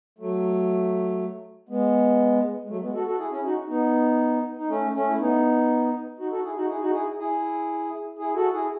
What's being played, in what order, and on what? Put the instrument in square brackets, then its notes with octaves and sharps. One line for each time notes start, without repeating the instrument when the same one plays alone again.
[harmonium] F#3 A3
G#3 B3
G#3
F#3 A3
G#3 B3
F#4 A4
F#4 A4
E4 G#4
C#4 E4
D#4 F#4
B3 D#4
D#4
A3 C#4
A3 C#4
E4
B3 D#4
D#4 F#4
F#4 A4
E4 G#4
D#4 F#4
E4 G#4
D#4 F#4
E4 G#4
E4 G#4
E4 G#4
F#4 A4
E4 G#4